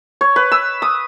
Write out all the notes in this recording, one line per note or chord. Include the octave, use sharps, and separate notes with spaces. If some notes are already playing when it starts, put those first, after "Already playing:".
C#5
B4
E6
D#6